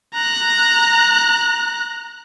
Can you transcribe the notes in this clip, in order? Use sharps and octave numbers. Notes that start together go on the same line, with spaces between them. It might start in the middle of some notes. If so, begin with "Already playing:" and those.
A#5 F#6